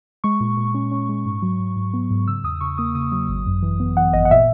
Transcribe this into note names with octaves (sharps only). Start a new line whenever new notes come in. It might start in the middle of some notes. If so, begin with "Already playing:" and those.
G#3 C#6
A#2
A#2
C#4
C#4
G#3
G#2
F#3
G#2
G#2
B3
G#2
C#3 E6
E2 D#6
C#3 C#6
A#3 D#6
C#3 D#6
F#3 D#6
G#1
F#2
E3
B3
E3 F#5
G#1 D#5
F#5
A#2 E5